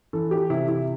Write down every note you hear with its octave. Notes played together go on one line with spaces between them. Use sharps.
E3 A4
G4
C3 E4
E4